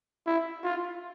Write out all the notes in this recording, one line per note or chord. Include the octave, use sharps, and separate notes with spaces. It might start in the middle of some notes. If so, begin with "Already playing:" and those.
E4
F4